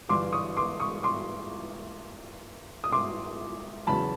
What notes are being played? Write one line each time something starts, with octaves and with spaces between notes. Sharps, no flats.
G1 G2 E3 C6 D6
C#6 D#6
C6 D6
C#6 D#6
C6 D6
D#6
C6 D6
E2 C#3 F#3 A5 B5